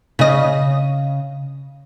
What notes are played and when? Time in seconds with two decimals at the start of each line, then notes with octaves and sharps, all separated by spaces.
0.19 C#3 D#5